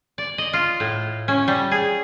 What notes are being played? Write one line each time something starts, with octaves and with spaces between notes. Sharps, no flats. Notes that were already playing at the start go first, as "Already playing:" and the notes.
D5
D#5
F4
A2
C#4
G3
G#4